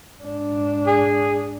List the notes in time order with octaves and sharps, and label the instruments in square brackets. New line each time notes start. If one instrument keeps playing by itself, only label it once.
[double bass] G#2 D4
[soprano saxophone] G#4